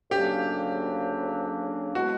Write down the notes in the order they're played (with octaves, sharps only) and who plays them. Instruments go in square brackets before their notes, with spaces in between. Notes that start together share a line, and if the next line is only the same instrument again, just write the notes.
[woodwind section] D2 C#3 F#3 A#3 D4 [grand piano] G4
[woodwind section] B2 G#3 B3 E4 [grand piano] F#4